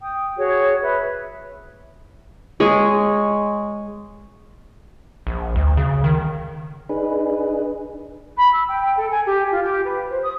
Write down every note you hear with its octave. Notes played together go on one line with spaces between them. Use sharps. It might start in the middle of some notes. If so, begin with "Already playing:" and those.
G5 D#6
F#4 G#4 C#5
B4 E5
G#3 C#5
A#1
D2
C#3
D#3
D4 D#4 G#4 B4
B5
E6
G5
A4
G#5
G4
F4
G4
B4
C5
D#6